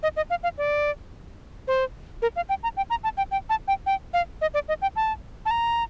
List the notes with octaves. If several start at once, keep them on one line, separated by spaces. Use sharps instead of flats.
D#5
D#5
F5
F5
D5
C5
A#4
F5
G5
A#5
G5
A#5
A5
G5
G5
A5
G5
G5
F5
D#5
D5
D#5
G5
A5
A5
A#5